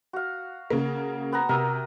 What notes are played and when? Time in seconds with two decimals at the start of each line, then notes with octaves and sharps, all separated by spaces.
0.13 F#4 F5
0.70 C#3 A#3
1.32 B3 F#5 A#5
1.49 C3 A#4 D#6 E6